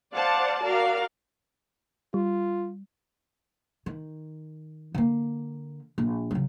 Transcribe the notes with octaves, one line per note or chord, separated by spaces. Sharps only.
C5 D5 F5 F#5 A5
F#4 A#4 D5 F5
G3 F4
D#3
D3 A#3
A#1
C#3 F#3